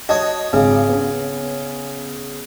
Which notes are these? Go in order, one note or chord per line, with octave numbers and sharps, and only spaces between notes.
F#4 C#5 D#5 A5 D#6
G#1 C#3
B3 C#4